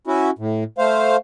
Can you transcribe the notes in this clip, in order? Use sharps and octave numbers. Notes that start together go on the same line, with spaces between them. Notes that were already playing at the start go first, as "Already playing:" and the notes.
C#4 E4 F#4
A2
A3 C5 F5